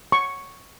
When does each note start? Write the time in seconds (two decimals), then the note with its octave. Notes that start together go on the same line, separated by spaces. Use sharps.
0.12 C#6